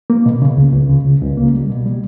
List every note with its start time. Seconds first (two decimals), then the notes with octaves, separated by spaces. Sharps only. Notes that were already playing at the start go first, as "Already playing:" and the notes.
0.10 A#3
0.26 B2
0.42 C#3
0.57 C#2
0.73 C#2
0.90 C#3
1.05 C#2
1.21 C#2
1.37 A#3
1.54 G3
1.70 B2
1.86 G3